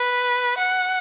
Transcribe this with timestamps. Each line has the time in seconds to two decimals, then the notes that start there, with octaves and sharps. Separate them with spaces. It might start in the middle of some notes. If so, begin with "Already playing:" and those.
Already playing: B4
0.57 F#5